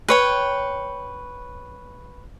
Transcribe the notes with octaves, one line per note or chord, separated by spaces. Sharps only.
B4 C#5 G5